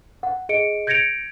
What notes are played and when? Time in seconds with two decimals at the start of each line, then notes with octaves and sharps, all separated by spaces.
0.23 F#5
0.49 G#4 D#5 C#7 D7
0.87 G6 G#6 A#6 C#7 D7 F7